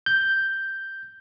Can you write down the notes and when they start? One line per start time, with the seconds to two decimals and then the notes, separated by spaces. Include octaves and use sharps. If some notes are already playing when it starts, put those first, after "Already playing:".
0.06 G6